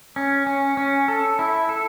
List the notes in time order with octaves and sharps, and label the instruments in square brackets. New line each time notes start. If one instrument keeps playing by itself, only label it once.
[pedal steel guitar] C#4
C#4
C#4
A4
E4
A4